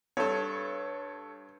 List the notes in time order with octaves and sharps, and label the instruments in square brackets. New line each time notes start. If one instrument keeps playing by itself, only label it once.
[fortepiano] G2 [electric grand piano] A4 C#5